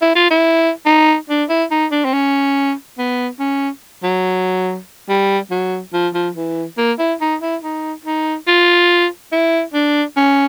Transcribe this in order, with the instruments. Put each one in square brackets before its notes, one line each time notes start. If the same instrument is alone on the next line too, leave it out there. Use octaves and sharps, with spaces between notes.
[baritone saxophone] E4
F4
E4
D#4
D4
E4
D#4
D4
C4
C#4
B3
C#4
F#3
G3
F#3
F3
F3
E3
A#3
E4
D#4
E4
D#4
D#4
F4
E4
D4
C#4